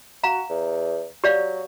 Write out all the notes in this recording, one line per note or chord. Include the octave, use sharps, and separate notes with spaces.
F#4 F5 A#5
E2
F#3 G4 D5 F5